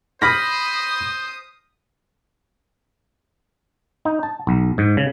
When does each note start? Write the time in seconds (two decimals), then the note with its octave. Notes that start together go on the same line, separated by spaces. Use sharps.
0.22 C5 B5 D#6 F6 A#6 B6
4.05 D#4
4.23 A5
4.47 B1
4.78 G#2
4.97 C#3